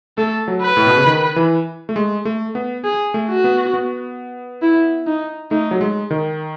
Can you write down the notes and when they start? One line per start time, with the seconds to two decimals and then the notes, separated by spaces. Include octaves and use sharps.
0.18 A3 A4
0.48 F#3
0.62 B4
0.77 A2
0.87 B2
0.96 C#3
1.07 D#3
1.36 E3
1.89 A3
1.96 G#3
2.25 A3
2.55 B3
2.84 G#4
3.14 A3
3.29 F#4
3.44 B3
3.74 B3
4.63 E4
5.07 D#4
5.51 A3 D#4
5.71 F#3
5.81 G#3
6.11 D#3